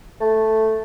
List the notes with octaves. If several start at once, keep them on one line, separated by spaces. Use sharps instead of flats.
A3